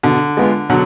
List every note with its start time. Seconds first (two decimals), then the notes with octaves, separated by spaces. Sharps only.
0.03 B2 D3
0.37 G#3 B3 F4
0.69 B2 D3 F#3